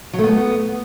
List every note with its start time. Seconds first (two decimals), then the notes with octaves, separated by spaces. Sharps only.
0.13 F#3
0.19 A3
0.24 B3